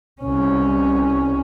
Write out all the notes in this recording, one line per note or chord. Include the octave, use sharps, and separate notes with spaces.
C2 C#4